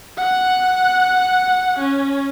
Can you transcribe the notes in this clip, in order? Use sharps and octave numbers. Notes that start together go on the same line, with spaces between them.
F#5 F#6
C#4